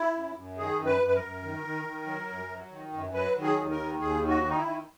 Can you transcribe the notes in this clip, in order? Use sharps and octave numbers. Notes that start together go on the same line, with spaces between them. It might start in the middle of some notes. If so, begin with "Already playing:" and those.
Already playing: E4
F#2
F#2
D#3 G#4
F#2
B4
F#2
B4
A#4
F#2
D#3
D#3
D#3
F#3
F#2
F#3
D#3
F#2
F#3 B4
D#3
G#4
D#2
A#4
D#3
D#2 G#4
D#3
F#4
D#3
D#4
E4
D#3